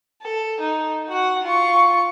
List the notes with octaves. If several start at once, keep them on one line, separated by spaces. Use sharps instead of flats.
A4
D#4
F#4 F#5
F4 C#6